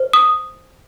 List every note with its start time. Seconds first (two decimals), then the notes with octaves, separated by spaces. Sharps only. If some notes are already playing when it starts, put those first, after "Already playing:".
Already playing: C5
0.13 D#6